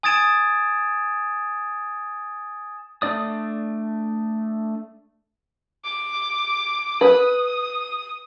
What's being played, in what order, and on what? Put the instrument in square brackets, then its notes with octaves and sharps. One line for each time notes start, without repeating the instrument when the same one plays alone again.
[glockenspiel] G#5 D#6 G#6 A6 D7 E7
[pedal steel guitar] A3 D4 D5 D#6
[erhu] D6
[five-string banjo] B4 [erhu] D#6